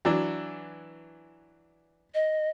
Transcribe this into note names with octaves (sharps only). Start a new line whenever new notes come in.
E3 F#3 D4
D#5